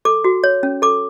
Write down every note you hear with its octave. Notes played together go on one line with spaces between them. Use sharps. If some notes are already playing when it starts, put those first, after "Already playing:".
A4 D6
F#4
C#5
C#4
A4 D6